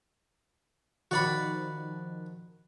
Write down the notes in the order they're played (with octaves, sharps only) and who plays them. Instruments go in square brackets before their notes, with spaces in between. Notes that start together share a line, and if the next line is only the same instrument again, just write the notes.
[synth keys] D#3 F3 [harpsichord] F#4 D5 B5